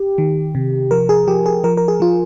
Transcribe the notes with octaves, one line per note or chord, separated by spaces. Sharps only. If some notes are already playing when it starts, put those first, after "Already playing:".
Already playing: G4
D#3
C3
F3 A#4
G#4
F3 G4
G#4
F3 A#4
A#4
G#4
F3 F4